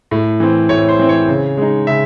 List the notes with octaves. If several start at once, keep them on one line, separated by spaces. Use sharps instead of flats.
A2
E3 C4
A2 C#5
C5
E3 C4
C#5
C#3
G#3 D#4
C#3 E5